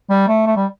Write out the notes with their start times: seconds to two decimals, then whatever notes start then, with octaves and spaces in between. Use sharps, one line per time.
0.10 G3
0.28 A3
0.46 A3
0.56 G3